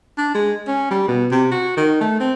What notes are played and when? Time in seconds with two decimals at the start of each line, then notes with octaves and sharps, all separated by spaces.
0.18 D4
0.34 G#3
0.67 C#4
0.91 G3
1.08 B2
1.31 C3
1.52 F#4
1.77 D#3
2.01 A3
2.20 C4